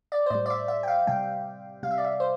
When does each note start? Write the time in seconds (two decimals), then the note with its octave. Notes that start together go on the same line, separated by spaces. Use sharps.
0.12 D5
0.26 C5
0.30 A2 G3 D5
0.46 D5
0.50 E5
0.68 E5
0.83 G5
0.88 F5
1.07 C3 G3 G5
1.83 C3 G3 F5
1.91 E5
1.98 D5
2.05 E5
2.20 C5